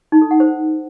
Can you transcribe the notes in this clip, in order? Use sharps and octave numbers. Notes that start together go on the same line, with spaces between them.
D#4
A4
F#5
C5